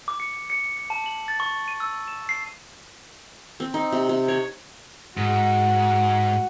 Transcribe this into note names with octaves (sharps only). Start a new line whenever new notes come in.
D6
C#7
C#7
C#7
A5
F#7
A6
C#6
D#7
E6
E7
C7
C4
D#4
C3
C3
C#5
G#2 F#4